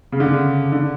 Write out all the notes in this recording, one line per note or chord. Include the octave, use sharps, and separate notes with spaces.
C#3
D3
C#3
D3